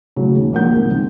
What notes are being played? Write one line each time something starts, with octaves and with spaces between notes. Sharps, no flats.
A2 C#3 F#3
D#2
A#1 A#3 A#4 F#5 G6
D#1 G#1 C#2 G#3
D#3 C4